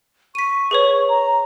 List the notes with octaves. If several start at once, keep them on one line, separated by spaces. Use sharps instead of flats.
C#6 B6 D#7
G#4 B4 C#5
A#5